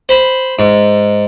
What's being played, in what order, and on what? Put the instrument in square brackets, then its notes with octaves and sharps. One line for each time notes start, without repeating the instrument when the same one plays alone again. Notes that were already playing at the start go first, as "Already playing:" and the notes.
[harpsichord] C5 B5
G#2